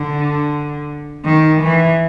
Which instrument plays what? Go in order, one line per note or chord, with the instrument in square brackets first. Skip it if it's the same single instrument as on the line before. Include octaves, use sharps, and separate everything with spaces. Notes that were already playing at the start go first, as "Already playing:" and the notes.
Already playing: [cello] D3
D#3
E3